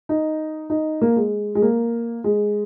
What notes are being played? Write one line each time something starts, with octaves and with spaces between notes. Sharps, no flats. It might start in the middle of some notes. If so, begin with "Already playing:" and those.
D#4
D#4
A#3
G#3
G#3
A#3
G#3